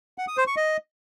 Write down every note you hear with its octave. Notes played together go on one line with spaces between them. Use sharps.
F#5
D#6
C5
C#6
D#5